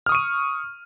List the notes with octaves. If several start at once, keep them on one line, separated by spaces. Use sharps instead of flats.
C#6 D#6 F6 D#7